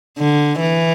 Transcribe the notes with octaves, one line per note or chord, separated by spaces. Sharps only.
D3
E3